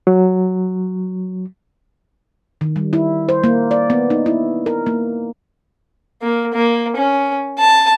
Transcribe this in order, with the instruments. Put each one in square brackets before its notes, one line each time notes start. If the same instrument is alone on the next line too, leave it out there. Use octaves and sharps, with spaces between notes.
[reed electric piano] F#3
[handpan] D#3
G3
E4
C5
A#3
D5
B3
D#4
E4
A#4
A#3
[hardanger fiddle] A#3
A#3
C#4
A5